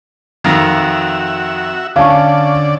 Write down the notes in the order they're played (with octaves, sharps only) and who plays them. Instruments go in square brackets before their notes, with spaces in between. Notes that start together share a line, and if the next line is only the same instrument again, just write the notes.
[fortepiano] F2 D#3 [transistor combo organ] F#4 E5
[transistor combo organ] D3 D5 [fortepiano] C#4 [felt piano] F5 A5 C#6